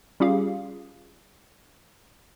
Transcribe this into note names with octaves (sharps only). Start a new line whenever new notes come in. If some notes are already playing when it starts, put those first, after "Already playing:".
G3 C#4 F4 G4 G#4 F5